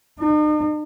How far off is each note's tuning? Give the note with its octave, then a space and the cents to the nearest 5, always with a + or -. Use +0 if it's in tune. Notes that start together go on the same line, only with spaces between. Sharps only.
D#4 -45